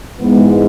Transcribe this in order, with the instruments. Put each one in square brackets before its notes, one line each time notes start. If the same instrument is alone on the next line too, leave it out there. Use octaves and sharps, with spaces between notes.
[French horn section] G#2 E3 G#3 B3